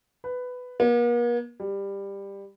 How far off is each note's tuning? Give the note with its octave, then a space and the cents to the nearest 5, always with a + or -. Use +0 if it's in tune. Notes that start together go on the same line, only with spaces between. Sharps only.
B4 +10
A#3 +45
G3 +15